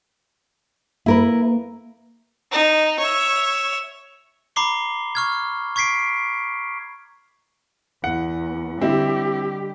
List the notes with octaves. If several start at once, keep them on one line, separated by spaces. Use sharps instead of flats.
A#3 E4 A#4 B4
D#4
C#5 E5
A#5 B5 D6 C7 G7
C#6 F6 G#6
C#6 G#6 B6 C7 D7
E2 F#5
D3 G3 C4 E4 G4 D#5